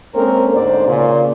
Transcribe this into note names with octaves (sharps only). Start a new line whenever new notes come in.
G#3 A#3 C4 C#4 A4 A#4
D2 G#2 C5 D5
A#2 C#3